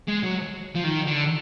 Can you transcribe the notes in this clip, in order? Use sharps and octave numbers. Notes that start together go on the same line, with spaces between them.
G#3
F#3
F3
D#3
D3